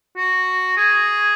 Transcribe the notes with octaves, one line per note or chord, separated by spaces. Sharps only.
F#4
G#4